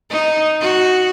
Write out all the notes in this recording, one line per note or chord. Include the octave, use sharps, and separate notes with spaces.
D#4
F#4